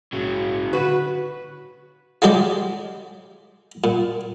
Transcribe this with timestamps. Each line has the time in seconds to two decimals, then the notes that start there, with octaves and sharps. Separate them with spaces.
0.13 A#1 G#2 C#3 F#3
0.73 D3 F#4 B4
2.22 F3 F#3 G#3 G4 D5
3.84 A#2